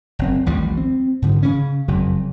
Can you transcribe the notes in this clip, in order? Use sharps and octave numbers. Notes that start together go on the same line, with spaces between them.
F#1 C4
A1 D#2 F3 G3
C4
G#2 D3 D#3
C#3 C#4
F#1 F2 C#3 F#3